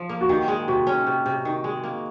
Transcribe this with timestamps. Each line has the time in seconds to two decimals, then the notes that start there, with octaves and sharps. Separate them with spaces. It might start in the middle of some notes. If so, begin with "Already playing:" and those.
Already playing: F3
0.09 A#3
0.21 F#4
0.29 D#3 G4
0.48 G#3
0.68 C3 F#4
0.87 C#4
1.07 C3
1.26 C3
1.45 D#3
1.64 G#3
1.83 A#3